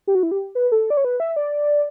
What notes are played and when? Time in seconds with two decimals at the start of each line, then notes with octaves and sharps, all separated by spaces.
0.07 G4
0.15 F#4
0.23 E4
0.31 G4
0.55 B4
0.72 A4
0.90 D5
0.97 C#5
1.05 B4
1.20 E5
1.36 D5